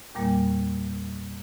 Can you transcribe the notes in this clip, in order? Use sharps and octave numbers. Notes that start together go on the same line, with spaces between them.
E2 A#2 G3 A#3